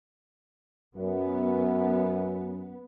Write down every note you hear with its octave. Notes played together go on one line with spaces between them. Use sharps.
F#2 B3